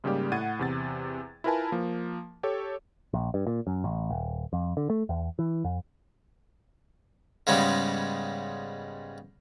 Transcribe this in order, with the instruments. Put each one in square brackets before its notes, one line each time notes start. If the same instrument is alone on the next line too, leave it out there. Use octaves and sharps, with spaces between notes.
[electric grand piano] G#2 C#3 G3 A#3 G4 D5
A2 F#5 G#6 A6 D#7
E2 C3 A6
E4 F4 A#4 B4 G#5 A5
F3 A#3
G4 A4 C#5
[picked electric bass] A#1
G2
A#2
F#2
A1
D#1
F2
D3
A3
E2
E3
F2
[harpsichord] G#2 C#3 G3 G#3 B3